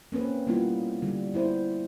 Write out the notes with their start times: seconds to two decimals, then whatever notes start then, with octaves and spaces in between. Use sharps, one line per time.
0.12 A#3 C4 C#4 B4
0.47 G3 A#3 B3 E4 F4
1.02 D3 G3
1.34 B3 E4 C5